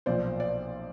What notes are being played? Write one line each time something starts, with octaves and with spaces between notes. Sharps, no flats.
B1 A#2 F3 C5 D5
D5